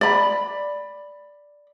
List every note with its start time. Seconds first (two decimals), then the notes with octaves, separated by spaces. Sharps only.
0.01 D5 B5